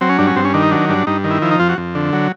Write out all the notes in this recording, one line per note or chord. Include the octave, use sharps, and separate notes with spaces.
F#3 C4
C#4
G2 D4
C#4
G2 C4
C#4
D#3 D4
D#4
F#3 D4
G2 D4
G2 D#4
D#3
E4
F3 E4
D#4
F2 F4
F#4
F2
D3
F#3